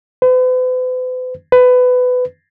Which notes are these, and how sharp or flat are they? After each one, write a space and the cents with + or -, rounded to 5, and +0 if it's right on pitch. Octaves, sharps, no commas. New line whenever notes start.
B4 +45
B4 +20